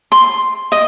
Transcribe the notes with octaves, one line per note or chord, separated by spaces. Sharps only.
C6
D#5